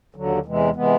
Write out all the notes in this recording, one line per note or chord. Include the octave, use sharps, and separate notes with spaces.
D#2 D3 F#3
E2 C3 E3 G#3
C3 E3 G#3 B3